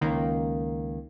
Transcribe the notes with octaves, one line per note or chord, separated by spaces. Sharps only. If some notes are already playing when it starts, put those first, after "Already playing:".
C#2 D#3 A#3